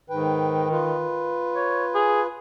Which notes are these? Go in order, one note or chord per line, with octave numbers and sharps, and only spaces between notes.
G#2 D#3 B4 G5
F4 B4
C#5
G#4